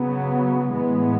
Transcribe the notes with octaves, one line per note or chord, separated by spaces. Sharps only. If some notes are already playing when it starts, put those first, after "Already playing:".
Already playing: C#3 F#3 B3
A2 E3 G#3 B3